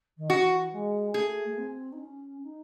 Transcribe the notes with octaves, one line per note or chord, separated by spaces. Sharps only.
D#3
E3 F#4
G#3
A3 G#4
A3
C4
D#4
C#4
D#4